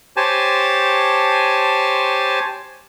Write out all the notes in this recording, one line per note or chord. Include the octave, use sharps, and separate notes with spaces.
G4 C5 C#5 G#5 A5